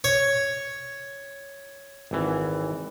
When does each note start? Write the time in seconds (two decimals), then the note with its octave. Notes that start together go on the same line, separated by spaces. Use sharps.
0.04 C#5
2.11 G#1 E3